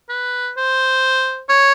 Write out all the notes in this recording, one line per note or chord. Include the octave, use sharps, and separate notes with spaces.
B4
C5
C#5